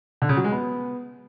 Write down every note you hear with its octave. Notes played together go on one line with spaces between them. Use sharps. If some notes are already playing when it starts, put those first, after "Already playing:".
D3
C#3
F#3
G#3
B3